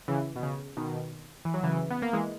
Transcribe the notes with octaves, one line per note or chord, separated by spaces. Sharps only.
C#3 E3
B2
C#3
B2 D#3
E3
F#3
C#3 E3
B3
A#3
E3 G#3